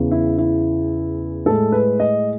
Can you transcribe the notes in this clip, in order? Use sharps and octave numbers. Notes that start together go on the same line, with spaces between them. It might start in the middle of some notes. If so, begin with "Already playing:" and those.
Already playing: E2 C#3 E3
E4
E4
A2 G#3 A4
B4
D#5